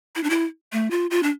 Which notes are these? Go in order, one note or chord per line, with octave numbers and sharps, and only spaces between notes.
E4
D4
E4
A3
F4
F4
D4